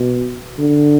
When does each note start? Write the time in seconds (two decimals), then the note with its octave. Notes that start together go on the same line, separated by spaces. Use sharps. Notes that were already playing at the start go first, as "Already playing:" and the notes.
Already playing: B2
0.59 D3